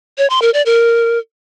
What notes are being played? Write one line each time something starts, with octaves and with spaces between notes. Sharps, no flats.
C#5
C6
A#4
D5
A#4